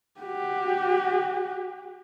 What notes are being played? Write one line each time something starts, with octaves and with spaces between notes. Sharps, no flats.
F#4 G4